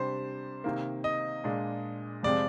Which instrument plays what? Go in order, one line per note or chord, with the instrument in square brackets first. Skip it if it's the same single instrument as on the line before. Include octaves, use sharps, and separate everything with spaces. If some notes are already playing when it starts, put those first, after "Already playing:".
Already playing: [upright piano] C3 G3 D4 G4 [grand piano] C5
[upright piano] C3 D#3 A#3
[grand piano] D#5
[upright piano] A#2 G#3 D4
[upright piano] F2 C3 F3 G#3 C4 [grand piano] D5